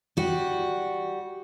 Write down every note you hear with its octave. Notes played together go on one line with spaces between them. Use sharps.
G3 F#4